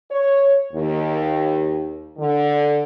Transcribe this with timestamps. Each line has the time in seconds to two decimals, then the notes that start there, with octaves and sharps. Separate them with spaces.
0.10 C#5
0.73 D#2
2.18 D3